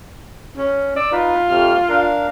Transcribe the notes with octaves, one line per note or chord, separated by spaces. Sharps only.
C#4
D5 E6
D#4 F4 B4
F2 C3 F6
D4 A#4 F5